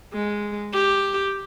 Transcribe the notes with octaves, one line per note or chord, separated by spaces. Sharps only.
G#3
G4